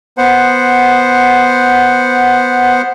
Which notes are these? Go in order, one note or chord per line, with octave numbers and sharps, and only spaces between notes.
B3 C5 F#5